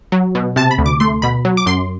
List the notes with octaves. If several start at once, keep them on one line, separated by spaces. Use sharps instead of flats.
F#3
B2
C3 A5
B5
D2
D6
A3 C6
B2 B5
F#3
D6
F#2 C6